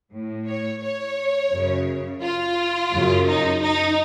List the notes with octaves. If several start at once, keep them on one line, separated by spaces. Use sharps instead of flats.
A2
C#5
C#5
F#2 C#3
F4
F#2 C#3
D#4
D#4